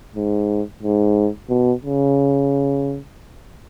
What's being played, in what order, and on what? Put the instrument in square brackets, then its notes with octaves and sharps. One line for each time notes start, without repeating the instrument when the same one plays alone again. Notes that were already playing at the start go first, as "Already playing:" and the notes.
[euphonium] G#2
G#2
B2
C#3